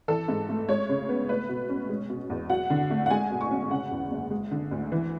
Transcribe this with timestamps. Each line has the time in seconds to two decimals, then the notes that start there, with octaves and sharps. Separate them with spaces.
0.08 E3 A4
0.28 G#2
0.49 A3
0.69 G#3 C#5
0.89 C#3
1.09 B3
1.29 A3 B4
1.49 B2
1.69 C#4
1.89 G#3
2.09 B2
2.30 E2
2.50 F#3 F#5
2.70 D3
2.90 A3
3.06 F#5
3.10 G#3 G#5
3.31 B2
3.41 C#6
3.51 C#4
3.71 C#3 F#5
3.91 E2
4.11 F#1
4.31 G#3
4.51 D3
4.71 D2
4.92 E3